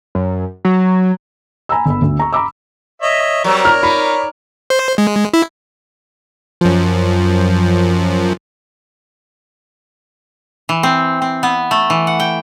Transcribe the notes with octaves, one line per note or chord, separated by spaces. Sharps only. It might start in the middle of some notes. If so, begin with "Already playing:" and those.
F#2
F#3
G#5 A#5 B5 E6
G1 B5
D2 D3
A#5 C#6
A#5 B5 D6 E6
C#5 D#5 E5
F#3 G3 C4 A#4 C#5 D5
F6
D#4 B5
C5
G#3
E4
F#2 F3
E3
C4
C4
B3
A3
E3
F#5
G5